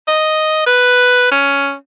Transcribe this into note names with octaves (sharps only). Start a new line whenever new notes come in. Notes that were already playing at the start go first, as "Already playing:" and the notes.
D#5
B4
C#4